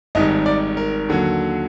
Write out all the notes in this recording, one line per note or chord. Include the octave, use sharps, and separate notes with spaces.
G#1 G#2 D#3 G3 D#5
D5
A#4
D#2 D3 F#3